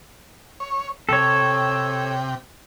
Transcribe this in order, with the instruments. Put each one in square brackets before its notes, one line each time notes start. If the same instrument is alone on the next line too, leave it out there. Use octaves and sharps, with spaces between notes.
[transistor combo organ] C#5
[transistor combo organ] C3 G5 [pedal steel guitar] A4 C#5